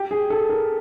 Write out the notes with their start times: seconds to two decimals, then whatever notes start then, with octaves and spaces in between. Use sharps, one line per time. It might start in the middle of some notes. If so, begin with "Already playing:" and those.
Already playing: G4
0.11 G#4
0.30 A4
0.49 A#4